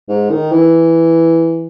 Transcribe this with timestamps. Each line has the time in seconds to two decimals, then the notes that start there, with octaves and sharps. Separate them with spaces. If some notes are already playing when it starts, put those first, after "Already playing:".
0.09 G#2
0.30 D#3
0.52 E3